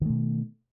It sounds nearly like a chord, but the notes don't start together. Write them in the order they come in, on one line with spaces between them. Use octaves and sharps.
D#3 A3 B2